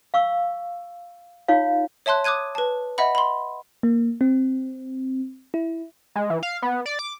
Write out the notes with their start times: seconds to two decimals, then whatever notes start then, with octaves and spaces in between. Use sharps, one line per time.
0.14 F5 C#6 E6
1.48 D#4 F4 C#5 F5
2.06 C#5 E5 A5 C6 F#6
2.24 D6 D#6 F#6 G#6 D#7
2.55 B4 A5
2.98 D#5 E5 F#5 B5
3.15 B5 C6
3.83 A#3
4.21 C4
5.54 E4
6.15 G#3
6.30 E3
6.43 F5
6.62 B3
6.86 D5
6.99 D6